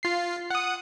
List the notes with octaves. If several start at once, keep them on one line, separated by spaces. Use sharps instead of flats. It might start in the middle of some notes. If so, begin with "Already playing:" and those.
F4 C7
F#5 D#6